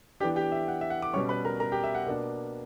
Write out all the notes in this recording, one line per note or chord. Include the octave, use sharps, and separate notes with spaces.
E3 B3 D4 G4 G5
G4 G5
E5
F#5
E5
F#5
D6
B2 G3 C#4 C#5 C#6
B4 B5
A#4 A#5
A#4 A#5
G4 G5
E5
F#5
B2 A#3 D4